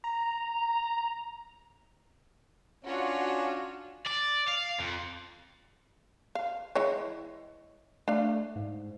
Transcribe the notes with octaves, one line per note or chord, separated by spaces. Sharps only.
A#5
C#4 D4 F4 F#4
D5
F5
F2
F5
E3 G#3 C#5
A3 D4 F5
G#2